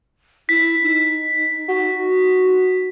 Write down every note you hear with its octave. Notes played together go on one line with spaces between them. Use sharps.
E4 B6
D#4
F#4